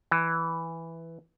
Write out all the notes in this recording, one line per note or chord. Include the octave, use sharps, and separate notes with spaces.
E3